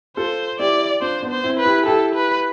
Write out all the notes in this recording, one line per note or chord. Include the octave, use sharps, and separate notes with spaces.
F4 A4 C5
E4 G4 D5
D4 F4 C5
B3 D4
C5
C4 E4
B4
E4 G4
E4 G4 A4
B4